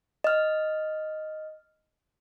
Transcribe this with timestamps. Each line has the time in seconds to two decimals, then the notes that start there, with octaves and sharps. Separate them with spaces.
0.24 D#5 F6